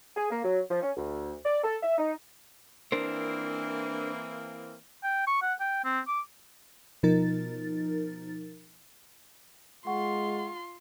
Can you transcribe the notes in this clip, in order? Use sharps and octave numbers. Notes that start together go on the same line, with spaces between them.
G#4
A#3
F#3
F3
C#4
D2
D5
A4
E5
D#4
E3 A#3 C4 D4 A#4 C5
G5
C#6
F#5
G5
C4
D6
B2 F3 D#4 A#4 A6
G#3 F4 F#5 C6 C#6